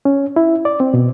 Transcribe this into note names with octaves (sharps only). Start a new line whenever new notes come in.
C#4
E4
D5
C4
B2